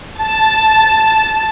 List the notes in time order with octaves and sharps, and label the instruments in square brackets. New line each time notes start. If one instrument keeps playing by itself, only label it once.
[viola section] A5